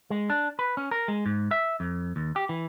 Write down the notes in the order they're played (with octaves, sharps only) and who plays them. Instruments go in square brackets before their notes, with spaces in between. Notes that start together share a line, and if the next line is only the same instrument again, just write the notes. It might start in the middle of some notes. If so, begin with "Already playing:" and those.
[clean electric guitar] G#3
D4
B4
C#4
A#4
G#3
G#2
E5
F2
D#2
G4
E3